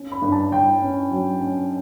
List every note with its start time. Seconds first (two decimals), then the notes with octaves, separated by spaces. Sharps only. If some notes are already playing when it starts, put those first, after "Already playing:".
Already playing: C#4
0.12 B5
0.22 G2
0.32 A5
0.52 G2 G5
0.82 C#4
1.11 F#3
1.41 C#4